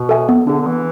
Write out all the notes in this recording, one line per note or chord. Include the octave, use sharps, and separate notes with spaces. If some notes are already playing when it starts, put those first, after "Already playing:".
Already playing: B2
A4 E5 G#5
B3
D3 D4 G#4
D3
E3 B3